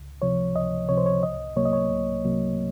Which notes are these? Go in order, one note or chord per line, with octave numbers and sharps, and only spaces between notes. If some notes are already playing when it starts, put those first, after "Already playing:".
Already playing: C#2
C3 F3 C#5
C#2 D#5
C3 F3 C#5
C5
C#5
C2 D#5
C3 F#3 A#3 C#5
D#5
C#5
C2
C3 F#3 A#3